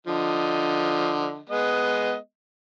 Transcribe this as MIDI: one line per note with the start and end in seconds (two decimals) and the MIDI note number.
0.07 1.41 50
0.07 1.41 53
0.07 1.41 75
1.49 2.16 56
1.49 2.16 59
1.49 2.16 75